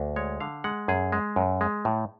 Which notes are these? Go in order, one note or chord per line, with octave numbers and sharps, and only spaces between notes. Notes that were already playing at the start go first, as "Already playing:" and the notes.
Already playing: D2
G#3 C#5
D3 F5
G#3 F#5
F#2 G#4
G#3
F#2
G#3
A2